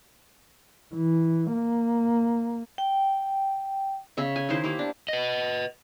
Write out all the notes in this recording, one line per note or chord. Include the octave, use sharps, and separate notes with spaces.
E3
A#3
G5
C#3 E5 C#6
G#5
D#3 D#4 E4 C5
A#3 E4 G4
D4
B4 D#5